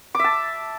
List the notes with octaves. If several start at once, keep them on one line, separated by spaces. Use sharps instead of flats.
E5 A5 D6